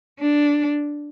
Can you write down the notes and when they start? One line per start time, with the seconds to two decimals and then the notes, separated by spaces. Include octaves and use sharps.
0.20 D4